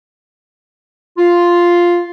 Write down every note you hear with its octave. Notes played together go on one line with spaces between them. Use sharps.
F4